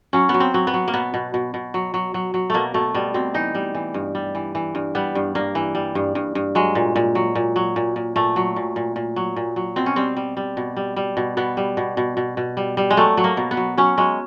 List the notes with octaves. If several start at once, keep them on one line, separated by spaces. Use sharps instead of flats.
F#3 C#4
F#3 B3
C4
F#3
B3
F#3
A#3
B2 B3
B2
B2
B2
F#3
F#3
F#3
F#3
B2 A3 A#3
B2 A3
B2 G3
B2 C4
E3 D#4
G3
E3
G2
G3
E3
E3
G2
G3 B3
G2
G2 A#3
E3
G3
G2
G2
G2
F#3 G#3
A#2
A#2
F#3
A#2
F#3
A#2
A#2
A#2 A3
F#3
A#2
A#2
A#2
F#3
A#2
F#3
B2 C4
C#4
G3 C4
G3
G3
B2
G3
G3
B2
B2 B3
G3
B2
B2
B2
B2
G3
G3
G#3
F#3 A3
F#3
A#3
B2
B3
F#3
F#3 C#4
F#3 G#3